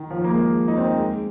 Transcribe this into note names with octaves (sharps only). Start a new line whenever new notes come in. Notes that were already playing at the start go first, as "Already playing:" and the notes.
Already playing: D#3
F3
A#3
G#3
D#4
C4
A#3
G#3